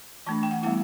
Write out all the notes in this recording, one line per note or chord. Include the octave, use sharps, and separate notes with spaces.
E3 A3 D4 A5
G5
F#5
G3 B3 E4 F#5